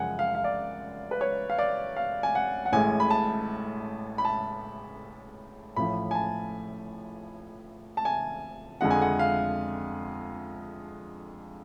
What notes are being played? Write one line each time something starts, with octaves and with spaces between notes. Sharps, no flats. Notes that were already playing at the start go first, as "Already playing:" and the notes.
Already playing: F#2 C#3 F3 G#3 F#5 G#5
F5
F5
D5
B4
C#5
F5
D5
F5
G#5
F#5
F#5
A1 A2 G#3 G#5
B5
A5
B5
A5
A1 A2 F3 B5
G#5
A5
A5
G#5
F2 D3 F3 G#3 F#5
G#5
F#5
F5